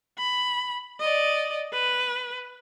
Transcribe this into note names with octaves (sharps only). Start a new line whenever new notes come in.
B5
D5 D#5
B4